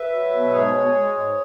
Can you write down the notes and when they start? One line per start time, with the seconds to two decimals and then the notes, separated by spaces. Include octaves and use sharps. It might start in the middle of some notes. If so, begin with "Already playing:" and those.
Already playing: B4 E5
0.09 F#3
0.31 B2
0.52 G#2 G#4 C#5
0.73 G#3
0.95 G#3
1.16 G#2